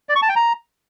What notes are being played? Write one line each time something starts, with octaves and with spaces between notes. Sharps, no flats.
D5
C#6
A5
G5
A#5